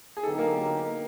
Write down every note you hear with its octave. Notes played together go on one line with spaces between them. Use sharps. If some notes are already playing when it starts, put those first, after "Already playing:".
G#4
D3 F#3 B3 D#4 G4 A4
A#3 A#4